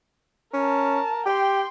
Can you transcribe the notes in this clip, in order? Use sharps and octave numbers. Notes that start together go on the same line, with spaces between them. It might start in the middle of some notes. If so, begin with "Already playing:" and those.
C#4 A#4 A5
G4 G5 C6